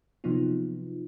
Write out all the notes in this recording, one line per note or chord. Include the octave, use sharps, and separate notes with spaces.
C3 F3 F#3 B3 D#4 F4